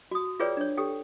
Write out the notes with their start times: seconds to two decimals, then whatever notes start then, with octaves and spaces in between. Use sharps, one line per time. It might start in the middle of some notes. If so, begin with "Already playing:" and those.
0.11 F#4 D#6
0.40 F4 G#4 B4 C#5 D5 G5
0.57 D4 C#5
0.78 G4 A4 G5